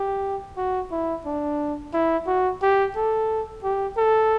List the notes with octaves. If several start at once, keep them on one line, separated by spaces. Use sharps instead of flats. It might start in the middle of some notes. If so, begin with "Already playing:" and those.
Already playing: G4
F#4
E4
D4
E4
F#4
G4
A4
G4
A4